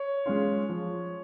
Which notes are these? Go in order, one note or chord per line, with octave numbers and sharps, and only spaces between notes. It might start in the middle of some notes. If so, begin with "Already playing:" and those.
Already playing: C#5
G#3 C#4 F4
F3